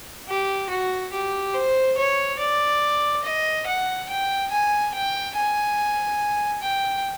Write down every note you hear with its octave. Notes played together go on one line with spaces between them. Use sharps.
G4
F#4
G4
C5
C#5
D5
D#5
F#5
G5
G#5
G5
G#5
G5